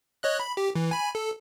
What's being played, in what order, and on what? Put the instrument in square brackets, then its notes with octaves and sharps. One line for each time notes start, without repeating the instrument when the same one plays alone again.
[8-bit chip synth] C#5 D#5 F#6
B5
G4
E3
G#5 B5
A4